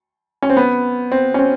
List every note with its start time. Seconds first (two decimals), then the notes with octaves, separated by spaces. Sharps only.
0.42 C#4
0.50 C4
0.57 B3
1.12 C4
1.34 C#4
1.39 C4